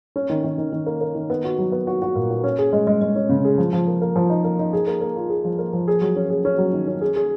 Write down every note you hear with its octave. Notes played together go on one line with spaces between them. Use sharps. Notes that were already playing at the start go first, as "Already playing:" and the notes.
C#4
D#3
D#3
D#3
D#3
A#3
A#3
D#3
B3
F#4
F#3
B3
F#4
F#4
A#2
F#4
C#4
G#4
G#3
G#3
G#3
C#4
C#3
G#4
F3
F3
A#3
A#3
F3
D#4
A#3
D#4
G#4
A#3
A#3
F4
G#4
F3
A#3
F3
G#4
F#3
C#4
G#4
C#4
F#3
D#3
C#4
G#4
G#4